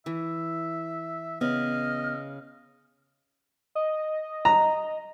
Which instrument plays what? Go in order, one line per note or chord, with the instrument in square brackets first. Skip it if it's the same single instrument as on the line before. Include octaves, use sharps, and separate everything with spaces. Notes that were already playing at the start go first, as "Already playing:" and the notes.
[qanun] E3 [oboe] E5
[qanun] C#3 [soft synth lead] B3 [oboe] D#5 [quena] F6
[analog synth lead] D#5
[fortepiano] A#5